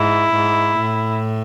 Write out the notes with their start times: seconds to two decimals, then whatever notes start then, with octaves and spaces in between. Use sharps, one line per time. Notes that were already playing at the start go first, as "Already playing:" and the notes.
Already playing: G#2 E4
0.33 G#2
0.80 A2